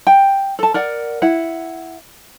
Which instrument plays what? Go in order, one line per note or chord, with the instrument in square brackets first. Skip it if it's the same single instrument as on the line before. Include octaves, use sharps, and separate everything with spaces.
[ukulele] G5
A4 A5
A#4 D5 F#5
E4 F#5